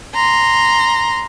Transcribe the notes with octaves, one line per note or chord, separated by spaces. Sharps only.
A#5 C6